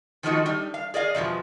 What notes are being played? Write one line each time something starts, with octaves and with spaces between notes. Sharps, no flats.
D#3 F3 G#3 A3 D#4 F#4
G3 D#4
F5
G#4 D5 D#5 F5
E2 G2 B2 F3